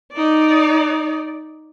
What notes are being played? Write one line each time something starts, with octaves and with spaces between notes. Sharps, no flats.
D#4 D5